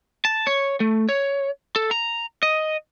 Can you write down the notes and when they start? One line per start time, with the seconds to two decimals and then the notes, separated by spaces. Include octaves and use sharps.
0.25 A5
0.47 C#5
0.80 A3
1.09 C#5
1.76 A4
1.91 A#5
2.43 D#5